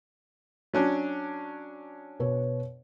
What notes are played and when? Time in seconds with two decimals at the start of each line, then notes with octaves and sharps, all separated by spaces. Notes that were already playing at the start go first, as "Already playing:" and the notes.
0.74 F#3 C#4 D4
2.20 B2 B4 C#5